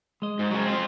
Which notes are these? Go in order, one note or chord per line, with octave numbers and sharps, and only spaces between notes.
G#3 D#5
G#2
C#3 F#3
C4 F4